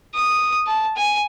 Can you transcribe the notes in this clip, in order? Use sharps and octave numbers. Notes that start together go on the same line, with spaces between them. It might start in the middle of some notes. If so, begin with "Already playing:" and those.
D#6
A5
G#5